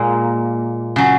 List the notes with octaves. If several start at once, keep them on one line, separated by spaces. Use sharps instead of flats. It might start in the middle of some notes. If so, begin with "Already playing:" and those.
Already playing: A#2 G#3 A#3
C#3 F#3